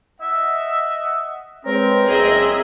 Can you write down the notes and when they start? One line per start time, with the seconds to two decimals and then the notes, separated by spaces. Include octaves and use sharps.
0.21 D#5 E5 F#5
1.66 G#3 C4 A#4 B4 C#5
2.09 F#1 G#4 D#5 E5